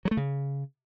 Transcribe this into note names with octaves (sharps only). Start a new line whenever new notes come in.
F#3
A3
C#3